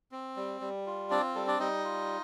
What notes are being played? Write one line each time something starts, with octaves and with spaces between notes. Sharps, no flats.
C4
G3
G3
F4
C4 D4 D5
G3 A4
D4 D5
G3 D#4 D#5
F4